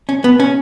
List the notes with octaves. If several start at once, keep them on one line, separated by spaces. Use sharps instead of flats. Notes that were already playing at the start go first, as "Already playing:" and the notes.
C#4
B3
C#4